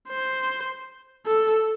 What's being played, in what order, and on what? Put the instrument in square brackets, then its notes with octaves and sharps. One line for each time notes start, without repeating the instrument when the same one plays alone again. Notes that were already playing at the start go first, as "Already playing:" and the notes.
[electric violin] C5
A4